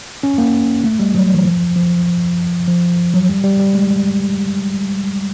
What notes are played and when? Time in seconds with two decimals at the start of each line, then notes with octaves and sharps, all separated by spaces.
0.23 C#4
0.38 A#3
0.84 A3
1.00 G3
1.15 F#3
1.34 E3
1.45 F3
1.76 F3
2.68 F3
3.14 F#3
3.29 G3
3.44 G3
3.59 G3
3.75 G#3